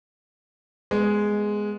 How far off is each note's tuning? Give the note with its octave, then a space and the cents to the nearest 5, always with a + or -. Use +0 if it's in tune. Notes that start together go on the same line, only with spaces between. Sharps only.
G#3 +0 B3 +0